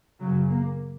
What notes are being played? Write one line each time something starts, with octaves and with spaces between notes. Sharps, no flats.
F#2 C#3 F#3
A#3